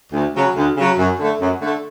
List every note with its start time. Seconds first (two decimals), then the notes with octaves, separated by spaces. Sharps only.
0.13 D2
0.35 C#3 F#3
0.56 D2
0.77 C#3 F#3
0.97 F#2
1.18 D3 A3
1.39 F#2
1.61 D3 A3